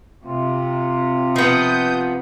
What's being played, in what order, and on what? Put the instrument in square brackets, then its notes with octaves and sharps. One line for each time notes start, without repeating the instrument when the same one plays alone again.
[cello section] C3 [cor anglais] F4
[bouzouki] F3 B3 [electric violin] D#6 G6